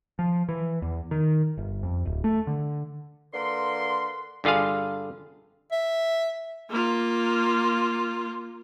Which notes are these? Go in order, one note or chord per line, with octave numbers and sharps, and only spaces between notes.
F3
E3
E2
D#3
G1
F2
D1
A3
D3
D3 A#3 B4 C6
G2 D3 F4 G#4 F5
E5
A#3 F4